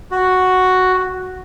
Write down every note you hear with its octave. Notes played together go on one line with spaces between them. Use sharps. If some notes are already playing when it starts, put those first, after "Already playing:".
F#4